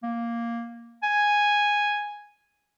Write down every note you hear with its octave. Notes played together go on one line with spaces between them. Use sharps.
A#3
G#5